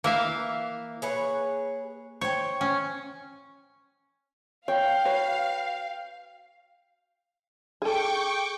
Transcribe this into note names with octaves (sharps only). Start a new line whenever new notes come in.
E3 A#3 E5 F5
G#4 B4 C#5
C5 C#5 G5
C#4
C#5 F5 G5
F#4 B4 C#5
G#4 A4 G5 C#6 D6